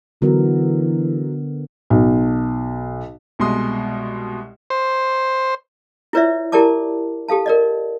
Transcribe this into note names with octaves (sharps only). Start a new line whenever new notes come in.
D3 E3 F#3 B3 A#4
B1
C2 B2 G#3 C6 D#6
C5
E4 F4 B4 C#5 D5 E5
E4 G4 A#4 D5 A5 D6
G4 A4 F5 A5
A#4 D5 D#5